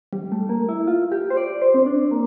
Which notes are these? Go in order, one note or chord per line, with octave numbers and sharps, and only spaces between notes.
G3
A3
A#3
E4
F4
G4
C5
D5
C5
C4
D4
A#3